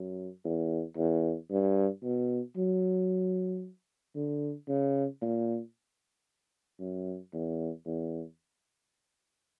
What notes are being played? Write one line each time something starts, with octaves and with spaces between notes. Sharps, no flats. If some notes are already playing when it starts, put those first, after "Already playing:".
Already playing: F#2
E2
E2
G2
B2
F#3
D3
C#3
A#2
F#2
E2
E2